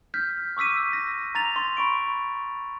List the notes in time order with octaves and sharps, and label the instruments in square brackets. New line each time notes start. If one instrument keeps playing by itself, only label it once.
[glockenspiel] F6 G6 B6
C#6 D6 E6 B6 D#7
A#6
A#5 A6 F7
C6
B5 C#6 D7